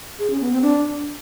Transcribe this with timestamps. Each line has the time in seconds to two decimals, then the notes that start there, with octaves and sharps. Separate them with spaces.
0.19 G#4
0.30 C#4
0.41 B3
0.52 C4
0.62 D4